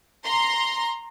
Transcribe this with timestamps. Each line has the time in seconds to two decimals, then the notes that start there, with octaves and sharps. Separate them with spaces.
0.25 A#5 C6